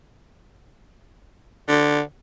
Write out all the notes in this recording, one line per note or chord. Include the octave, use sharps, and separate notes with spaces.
D3